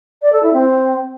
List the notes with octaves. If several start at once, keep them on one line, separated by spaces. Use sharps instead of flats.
D5
A4
E4
C4